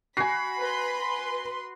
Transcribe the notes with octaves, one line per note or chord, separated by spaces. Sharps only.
F#4 G#5 B5 C7
B4 C6